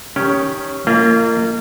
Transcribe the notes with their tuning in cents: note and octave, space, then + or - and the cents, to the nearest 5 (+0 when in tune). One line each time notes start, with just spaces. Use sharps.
D#3 +0 C#4 +0 G4 +0
A#3 -30 F4 -40 D#5 +0